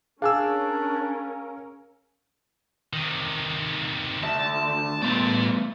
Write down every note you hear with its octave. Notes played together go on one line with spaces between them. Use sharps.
C#4 D4 G#4 A#4 F5 G#5 E6
C3 D#3
D2 E5 A5
A3 B3 F4 D5